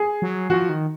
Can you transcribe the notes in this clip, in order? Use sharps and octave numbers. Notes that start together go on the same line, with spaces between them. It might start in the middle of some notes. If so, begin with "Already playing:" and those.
Already playing: G#4
F#3
F3 F#4
D#3